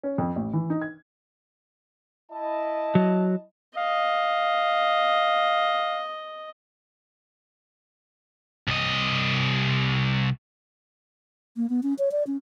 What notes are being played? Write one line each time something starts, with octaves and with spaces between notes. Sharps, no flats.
C#4
F2
A1
E3
D#4
G#6
E4 D#5 A5
F#3
D#5 F5
C2 D#5
A#3
B3
C#4
C#5
D5
C#4